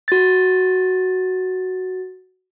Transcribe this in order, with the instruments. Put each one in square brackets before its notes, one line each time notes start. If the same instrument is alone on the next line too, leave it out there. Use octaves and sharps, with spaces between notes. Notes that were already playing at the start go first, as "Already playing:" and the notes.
[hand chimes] F#4 A6